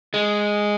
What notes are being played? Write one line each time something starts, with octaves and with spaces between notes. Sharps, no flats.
G#3